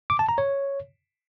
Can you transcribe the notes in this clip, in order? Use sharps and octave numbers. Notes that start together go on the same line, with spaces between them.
D6
A5
A#5
C#5